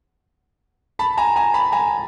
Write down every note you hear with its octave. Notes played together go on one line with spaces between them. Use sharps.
A5 B5
G#5 A#5
G#5 A#5
A5 B5
G#5 A#5